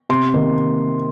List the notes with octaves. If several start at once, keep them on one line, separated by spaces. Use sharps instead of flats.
C3 C6
D#3 A#3